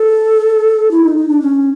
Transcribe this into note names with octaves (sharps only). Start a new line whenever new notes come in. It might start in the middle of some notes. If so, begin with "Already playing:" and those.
Already playing: A4
E4
D#4
D#4
D4
C#4